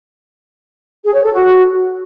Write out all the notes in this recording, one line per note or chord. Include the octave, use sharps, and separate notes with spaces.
G#4
C#5
A4
F#4